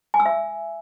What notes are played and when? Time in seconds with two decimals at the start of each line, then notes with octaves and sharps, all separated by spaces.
0.14 G#5
0.20 E6
0.26 E5